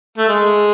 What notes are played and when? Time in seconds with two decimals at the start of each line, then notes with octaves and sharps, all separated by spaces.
0.18 A3
0.29 G#3